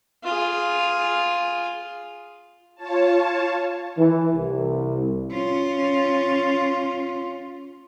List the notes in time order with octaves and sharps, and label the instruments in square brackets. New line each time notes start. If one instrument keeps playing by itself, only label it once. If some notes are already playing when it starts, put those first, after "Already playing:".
[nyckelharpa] F4 G#4
[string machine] F4 C#5 A5
[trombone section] E3
C2
[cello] C#4 F4